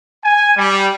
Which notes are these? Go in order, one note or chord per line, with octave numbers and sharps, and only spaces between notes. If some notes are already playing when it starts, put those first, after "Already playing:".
G#5
G3